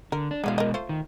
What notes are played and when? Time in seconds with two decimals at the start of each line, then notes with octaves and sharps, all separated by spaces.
0.12 D3 A#4
0.31 D4
0.44 B2 D3 F#3 G#3 F5
0.58 A#4 D#5
0.74 A3 F4 C5
0.89 D#3